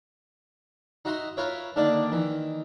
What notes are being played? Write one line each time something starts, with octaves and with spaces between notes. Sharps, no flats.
D#4 F#4 E5 A#5 C6
F4 A#4 B4 C#5 E5
D3 D#3 A#3 D4 D5
D#3 E3